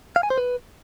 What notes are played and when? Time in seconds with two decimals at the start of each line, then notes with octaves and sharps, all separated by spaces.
0.16 F5
0.23 G#5
0.30 C5
0.38 B4